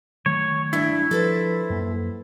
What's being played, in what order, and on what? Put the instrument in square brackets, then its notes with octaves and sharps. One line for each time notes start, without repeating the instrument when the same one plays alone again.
[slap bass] D#3 F#3 A3 [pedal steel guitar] C#5
[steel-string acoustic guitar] G2 D4 [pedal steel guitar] E4
[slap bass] F3 [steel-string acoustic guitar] A4 B4 C5
[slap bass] F#2 A#3